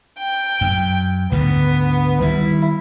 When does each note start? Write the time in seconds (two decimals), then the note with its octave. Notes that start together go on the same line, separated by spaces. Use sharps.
0.18 G5
0.61 F#2
1.32 D2 G#2 D3 B3
2.21 D#3 G3 E4